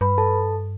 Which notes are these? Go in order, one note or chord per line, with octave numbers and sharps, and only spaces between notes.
G2 B4 B5
A4 A5